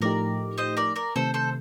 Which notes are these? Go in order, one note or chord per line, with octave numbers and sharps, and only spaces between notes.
A2 F3 A3 D#4 G4 A#4 D5
C5 D#5
A#4 D5
A#4 D5
C3 D#3 A3 A4 C5
A4 C5